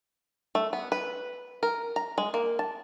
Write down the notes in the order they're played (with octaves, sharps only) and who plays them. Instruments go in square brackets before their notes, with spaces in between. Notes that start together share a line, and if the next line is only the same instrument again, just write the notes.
[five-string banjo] A3
B3
B4
A#4
A#5
G#3
A#3
A5